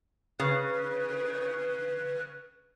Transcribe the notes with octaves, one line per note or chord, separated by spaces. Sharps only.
C#3 B4